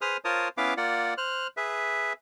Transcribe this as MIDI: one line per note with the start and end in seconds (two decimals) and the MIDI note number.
0.01 0.17 68
0.01 0.17 71
0.01 0.17 72
0.01 0.17 87
0.01 0.17 89
0.25 0.48 65
0.25 0.48 70
0.25 0.48 72
0.25 0.48 73
0.25 0.48 81
0.25 0.48 87
0.57 0.74 59
0.57 0.74 61
0.57 0.74 64
0.57 0.74 71
0.57 0.74 77
0.57 0.74 86
0.77 1.14 58
0.77 1.14 65
0.77 1.14 74
0.77 1.14 78
1.18 1.47 72
1.18 1.47 89
1.18 1.47 90
1.57 2.13 68
1.57 2.13 71
1.57 2.13 76